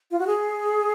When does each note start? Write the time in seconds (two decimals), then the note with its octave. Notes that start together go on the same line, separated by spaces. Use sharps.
0.11 F4
0.19 F#4
0.27 G#4